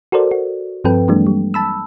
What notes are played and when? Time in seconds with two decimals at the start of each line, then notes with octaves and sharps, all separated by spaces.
0.12 F#4 A4 A#4 C5 D5
0.31 F#4
0.84 G2 F3 C4 A4 B4 G5
1.08 E3 F#3 G#3 A#3 D4
1.27 G3
1.54 A5 B5 E6